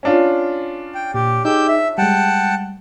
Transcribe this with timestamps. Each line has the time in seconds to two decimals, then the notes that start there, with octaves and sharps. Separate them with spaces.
0.03 C#4 D4 F4
0.95 G5
1.14 A#2 G4
1.45 D#4 G4 G#4 E6 G6
1.68 E5
1.98 G3 G#3 F#5 G5 A5